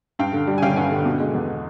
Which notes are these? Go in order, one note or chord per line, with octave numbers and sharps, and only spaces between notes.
G2 F5 G5
D3
G3
G#5
G1 F5 G5
G2 F#5 G#5
D3
B2
G#3
E2